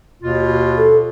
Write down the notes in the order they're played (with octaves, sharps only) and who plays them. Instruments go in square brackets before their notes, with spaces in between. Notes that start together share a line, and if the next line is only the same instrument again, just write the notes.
[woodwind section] D#2 B2 F4
[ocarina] A4